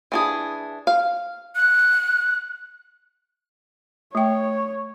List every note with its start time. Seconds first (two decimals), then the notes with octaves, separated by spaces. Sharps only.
0.12 E3 D4 G#4
0.87 F5
1.56 F#6
4.15 A3 C#5 G5